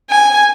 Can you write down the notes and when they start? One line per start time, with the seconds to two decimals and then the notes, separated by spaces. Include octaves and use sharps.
0.10 G#5